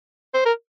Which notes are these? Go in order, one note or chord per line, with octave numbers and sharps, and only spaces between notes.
C5
A#4